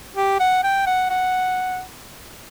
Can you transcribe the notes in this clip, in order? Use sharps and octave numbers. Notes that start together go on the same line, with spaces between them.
G4
F#5
G5
F#5
F#5